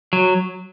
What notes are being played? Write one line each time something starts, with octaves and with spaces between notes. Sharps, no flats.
F#3